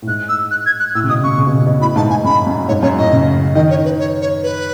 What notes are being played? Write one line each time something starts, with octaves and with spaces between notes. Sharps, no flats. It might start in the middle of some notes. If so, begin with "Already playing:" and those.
A2
G#2 F#6
E6
F#6
G#6
F#6
A2 E6
C#3
B2 D#6
C#3 C#6
C#3
B2
C#3
B2
A2 B5
G#2 A5
G#2 G#5
F#2 B5
F#2
G#2 C#5
F#2 C#5
A2 D#5
C#3
D#3 D#5
C#5
B4
C#5
C#5
B4